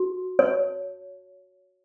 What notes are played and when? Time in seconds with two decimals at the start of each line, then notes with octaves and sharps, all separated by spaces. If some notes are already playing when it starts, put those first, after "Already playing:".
Already playing: F#4
0.39 C#5